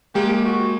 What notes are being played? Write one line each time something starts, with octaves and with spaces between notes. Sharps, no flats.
G#3 A#3 G4
F#4